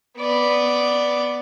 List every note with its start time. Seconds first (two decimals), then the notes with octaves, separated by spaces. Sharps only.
0.19 B3 D5